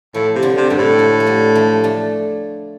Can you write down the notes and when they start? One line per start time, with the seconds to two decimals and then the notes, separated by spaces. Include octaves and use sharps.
0.14 A2 F3
0.35 C3
0.42 D3 G3
0.57 C3
0.70 G2 D3 G3
0.78 A2
0.99 F3 A3
1.20 A3
1.27 D3 G3
1.55 F3 A3
1.84 A3 D4